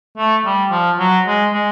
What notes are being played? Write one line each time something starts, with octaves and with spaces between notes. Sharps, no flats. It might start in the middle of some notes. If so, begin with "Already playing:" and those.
A3
G3
F3
F#3
G#3
G#3